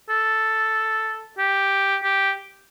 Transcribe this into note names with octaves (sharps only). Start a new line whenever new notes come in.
A4
G4
G4